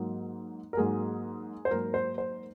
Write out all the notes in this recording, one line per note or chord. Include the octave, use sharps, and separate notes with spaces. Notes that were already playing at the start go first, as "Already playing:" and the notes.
Already playing: G#2 F#3 A#3
A#4
G#2 F#3 A#3 G#4
C5
G#2 F#3 A#3 A#4
C5
C5